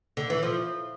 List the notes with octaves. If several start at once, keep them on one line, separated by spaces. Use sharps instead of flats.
D3
E3
F3